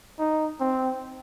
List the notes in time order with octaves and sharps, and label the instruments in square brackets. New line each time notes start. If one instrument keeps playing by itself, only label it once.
[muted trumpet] D#4
C4